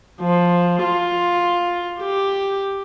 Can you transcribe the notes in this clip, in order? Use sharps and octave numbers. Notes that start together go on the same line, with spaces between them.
F3
F4
G4